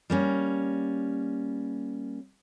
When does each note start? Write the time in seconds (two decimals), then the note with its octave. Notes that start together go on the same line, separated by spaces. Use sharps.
0.10 G3 A#3 C#4